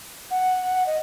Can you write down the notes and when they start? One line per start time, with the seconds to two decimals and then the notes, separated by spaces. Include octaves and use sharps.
0.31 F#5
0.86 D#5